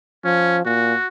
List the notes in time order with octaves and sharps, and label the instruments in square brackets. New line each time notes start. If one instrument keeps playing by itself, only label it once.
[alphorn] F3 [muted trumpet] C#4
[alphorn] A#2 [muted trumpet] F#4